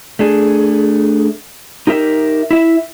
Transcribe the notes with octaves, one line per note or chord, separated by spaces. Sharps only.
A3 D4 G#4
D#4 G4 A#4 E5
E4 E5